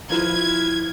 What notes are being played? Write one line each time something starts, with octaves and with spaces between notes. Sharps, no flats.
F3 E4 F4 B4 G#6